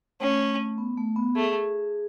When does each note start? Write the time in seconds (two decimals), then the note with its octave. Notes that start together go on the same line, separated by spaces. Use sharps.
0.20 A3 C#4
0.78 B3
0.97 A3
1.16 B3
1.35 A3 G#4